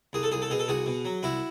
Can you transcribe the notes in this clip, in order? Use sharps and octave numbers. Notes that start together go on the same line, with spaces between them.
C2 G#4
A4
C2 G#4
A4
B2 G#4
A4
C2 F#4 G#4
B2
F#3
C2 E4 F#4